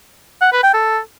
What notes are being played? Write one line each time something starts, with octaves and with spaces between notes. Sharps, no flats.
F#5
B4
G5
A4